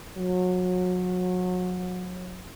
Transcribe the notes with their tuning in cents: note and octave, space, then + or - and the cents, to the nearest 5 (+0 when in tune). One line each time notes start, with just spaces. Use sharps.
F#3 -30